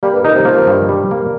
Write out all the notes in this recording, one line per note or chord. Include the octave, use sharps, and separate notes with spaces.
G3 A#3
G2
A#2 D#4
C3
F3 A#3
G2
G3
A#3